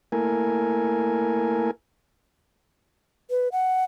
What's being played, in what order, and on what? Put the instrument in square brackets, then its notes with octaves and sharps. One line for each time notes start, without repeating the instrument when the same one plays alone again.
[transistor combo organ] A3 A#3 E4 A#4 G#5
[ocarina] B4
F#5